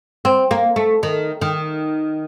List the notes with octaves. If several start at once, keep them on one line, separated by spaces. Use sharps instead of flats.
C4
A#3
A3
D#3
D#3